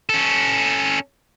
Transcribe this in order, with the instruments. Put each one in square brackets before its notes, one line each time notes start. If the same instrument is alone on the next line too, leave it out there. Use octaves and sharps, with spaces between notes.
[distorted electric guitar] C#4 A4